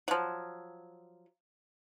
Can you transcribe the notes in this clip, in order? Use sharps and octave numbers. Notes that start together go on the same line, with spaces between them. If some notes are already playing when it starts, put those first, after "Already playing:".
F3 F#3